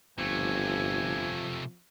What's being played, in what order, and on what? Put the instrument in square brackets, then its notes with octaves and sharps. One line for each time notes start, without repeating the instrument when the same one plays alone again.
[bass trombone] G1 [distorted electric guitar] C3 A3 [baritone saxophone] F3 [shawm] G#5